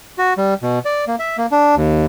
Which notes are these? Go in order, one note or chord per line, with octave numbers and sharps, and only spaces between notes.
F#4
G3
B2
D5
A#3
E5
A#3
D4
D#2